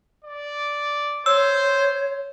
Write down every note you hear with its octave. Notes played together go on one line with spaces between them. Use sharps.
D5
C5 C#5 E6